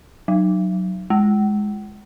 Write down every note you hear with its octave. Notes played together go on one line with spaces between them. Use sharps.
F#3
G#3